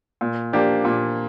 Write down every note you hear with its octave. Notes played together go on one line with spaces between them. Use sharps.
A#2
F3 A#3 D4 G4
A#2